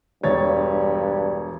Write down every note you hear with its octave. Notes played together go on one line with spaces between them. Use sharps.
E1 G2 C#5 A6